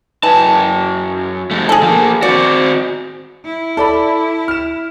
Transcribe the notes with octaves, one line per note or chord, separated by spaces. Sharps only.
F#2 E3 A5
F2 A3
G#4 A4
F3 A#3
C4 F#4 D5
E4
A4 D5 B5
F6 E7